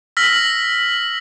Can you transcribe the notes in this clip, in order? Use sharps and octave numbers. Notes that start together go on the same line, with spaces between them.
E6 F6 A#6 B6 F#7